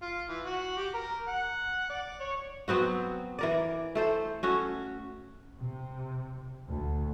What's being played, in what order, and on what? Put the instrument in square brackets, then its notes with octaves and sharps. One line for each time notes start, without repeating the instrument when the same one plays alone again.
[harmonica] F4
E3
F#4
G4
A#4
F#5
D5
C#5
[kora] F#3 B3 C4 F#4
E3 A#4 D5
A3 A4 C5
C#4 F#4 A4
[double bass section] C3
D2